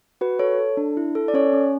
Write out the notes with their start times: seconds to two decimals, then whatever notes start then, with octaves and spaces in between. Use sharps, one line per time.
0.21 F#4 B4
0.39 A4 C#5
0.59 A4
0.77 D4
0.97 E4
1.15 A4
1.28 D5
1.34 C#4 C#5
1.53 C#4